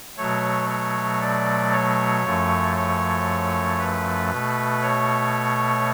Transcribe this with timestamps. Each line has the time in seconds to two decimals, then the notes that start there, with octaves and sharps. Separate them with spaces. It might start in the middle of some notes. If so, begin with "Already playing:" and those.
0.17 B2 F#3 A3 C#5
0.69 C#5
1.21 D5
1.72 C#5
2.24 F#2 F3 A3
2.76 C#5
3.79 B4
4.31 B2 A3
4.82 C#5